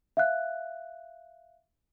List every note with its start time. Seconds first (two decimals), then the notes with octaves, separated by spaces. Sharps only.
0.17 E5 F5 F#6